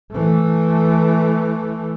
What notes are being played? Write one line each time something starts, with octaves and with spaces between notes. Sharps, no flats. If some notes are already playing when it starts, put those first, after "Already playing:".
E3 A3